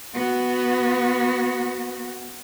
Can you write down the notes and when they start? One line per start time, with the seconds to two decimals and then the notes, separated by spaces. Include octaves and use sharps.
0.14 B3 F#4